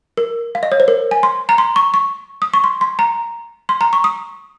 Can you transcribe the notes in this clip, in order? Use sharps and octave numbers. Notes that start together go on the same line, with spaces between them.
A#4
F5
D#5
C#5
C5
A#4
G#5
C6
A#5
C6
C#6
C#6
D#6
C#6
C6
C6
A#5
C6
A#5
C#6
D#6